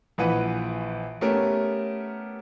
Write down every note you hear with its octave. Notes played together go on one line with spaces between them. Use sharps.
A#1 E3 B4 F#5
A3 B3 C#4 G4 A#4